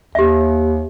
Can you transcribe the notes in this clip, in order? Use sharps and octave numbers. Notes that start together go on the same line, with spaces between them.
D#2 G4 E5